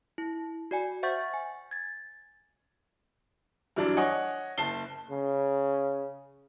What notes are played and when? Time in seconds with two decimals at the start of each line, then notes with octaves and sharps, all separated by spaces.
0.18 E4
0.71 F#4 D5 G#5
1.03 C5 E5 F#5 C#6 G6 A6
1.34 G#5
1.71 G#6 A6
3.76 G2 E3 F#3 D4
3.97 C#5 D#5 F#5 G#5
4.58 F#1 A5 C7 G7
5.11 C#3